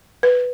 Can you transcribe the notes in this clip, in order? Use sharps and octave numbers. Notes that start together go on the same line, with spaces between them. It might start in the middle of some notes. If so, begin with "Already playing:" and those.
B4